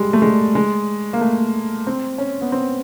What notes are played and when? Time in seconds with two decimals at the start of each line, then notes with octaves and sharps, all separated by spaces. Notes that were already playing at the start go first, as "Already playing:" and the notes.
Already playing: G3 G#3
0.13 A3
0.22 G#3
0.55 G#3
1.13 A#3
1.21 A3
1.87 C4
2.18 C#4
2.41 B3
2.52 C4